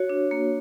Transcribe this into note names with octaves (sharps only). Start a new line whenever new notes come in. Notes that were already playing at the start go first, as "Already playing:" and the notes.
Already playing: F#4 C#5
D4
A#3